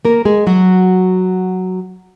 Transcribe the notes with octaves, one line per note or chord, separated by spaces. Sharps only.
A#3 A#4
G#3 G#4
F#3 F#4